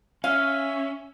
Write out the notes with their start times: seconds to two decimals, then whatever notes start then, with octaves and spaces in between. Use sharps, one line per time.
0.24 C#4 E5 F5 G#5